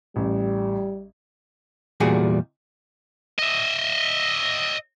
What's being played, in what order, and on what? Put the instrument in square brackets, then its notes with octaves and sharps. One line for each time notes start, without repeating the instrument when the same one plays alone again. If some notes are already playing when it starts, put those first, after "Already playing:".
[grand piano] A1 [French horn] G3
[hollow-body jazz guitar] E2 A#2 G3 F#4 G#4
[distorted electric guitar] D#5 E5